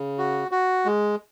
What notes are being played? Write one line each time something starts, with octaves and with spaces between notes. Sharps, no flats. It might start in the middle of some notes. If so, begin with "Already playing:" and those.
Already playing: C#3
F#4
F#4
G#3